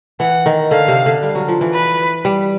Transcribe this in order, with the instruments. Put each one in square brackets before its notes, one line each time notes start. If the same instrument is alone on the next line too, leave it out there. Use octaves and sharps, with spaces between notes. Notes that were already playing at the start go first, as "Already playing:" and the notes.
[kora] E3 [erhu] F#5
[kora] D#3
[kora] D3 [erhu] F5
[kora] C3
D3
G3
F#3
F3
E3
[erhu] B4
[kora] G3